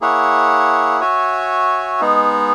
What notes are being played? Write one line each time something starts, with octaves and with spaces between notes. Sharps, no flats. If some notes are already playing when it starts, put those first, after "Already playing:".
A#3 E4 G#4 C#5 F#5
F#4 C#5 E5 G#5
G#3 B3 D#4 G#4